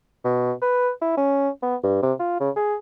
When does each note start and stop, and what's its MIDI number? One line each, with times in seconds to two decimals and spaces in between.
0.24 0.52 47
0.62 0.91 71
1.02 1.16 64
1.17 1.49 61
1.63 1.76 59
1.83 2.00 43
2.03 2.13 48
2.20 2.40 65
2.40 2.50 49
2.56 2.75 68